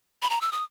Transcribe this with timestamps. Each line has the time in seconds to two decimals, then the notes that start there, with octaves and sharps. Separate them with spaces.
0.22 B5
0.30 A#5
0.41 E6
0.52 D#6